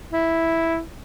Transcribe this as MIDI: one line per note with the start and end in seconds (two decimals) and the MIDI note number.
0.13 0.80 64